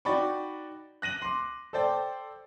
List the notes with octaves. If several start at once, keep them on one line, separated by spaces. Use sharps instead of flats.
D#4 F#4 D5 G5 B5 C#6
F#6 A#6 D#7 F#7
C6 D6
A4 C5 D5 G5 A5